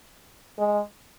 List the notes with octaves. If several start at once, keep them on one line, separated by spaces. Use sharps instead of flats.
G#3